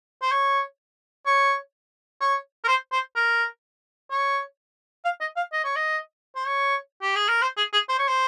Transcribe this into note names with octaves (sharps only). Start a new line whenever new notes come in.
C5
C#5
C#5
C#5
A#4
C5
C5
A#4
C#5
F5
D#5
F5
D#5
C#5
D#5
C5
C#5
G4
G#4
A#4
C5
G#4
G#4
C5
C#5
C5